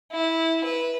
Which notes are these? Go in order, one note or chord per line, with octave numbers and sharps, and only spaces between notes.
E4
B4